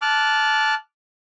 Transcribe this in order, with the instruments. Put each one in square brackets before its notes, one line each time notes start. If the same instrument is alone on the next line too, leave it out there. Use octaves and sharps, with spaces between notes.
[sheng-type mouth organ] A5 D6 F6 F#6